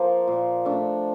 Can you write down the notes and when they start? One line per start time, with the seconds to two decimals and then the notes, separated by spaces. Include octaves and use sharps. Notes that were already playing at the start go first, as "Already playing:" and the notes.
Already playing: F3 A#3 C5
0.28 A#2
0.65 A3 D4